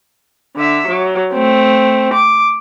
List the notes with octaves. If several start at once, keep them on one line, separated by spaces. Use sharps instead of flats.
D3 E5
F#3
A3 C4
D6